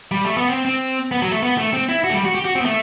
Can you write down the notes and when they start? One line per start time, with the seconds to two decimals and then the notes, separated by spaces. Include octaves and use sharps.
0.11 G3
0.25 A3
0.37 B3
0.50 C4
0.65 C4
1.11 B3
1.22 F#3
1.32 A3
1.43 B3
1.58 A3
1.73 C4
1.89 E4
2.04 F#4
2.10 A3
2.14 G3
2.25 F#4
2.35 G4
2.45 F#4
2.55 C4
2.61 B3
2.65 A3